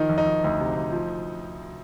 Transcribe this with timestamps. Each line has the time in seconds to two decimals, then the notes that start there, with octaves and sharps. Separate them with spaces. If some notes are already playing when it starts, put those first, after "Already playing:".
Already playing: D#3 F3 D#4
0.09 F2
0.18 D#4
0.26 F2
0.44 D2
0.60 C3
0.76 D2
0.92 F3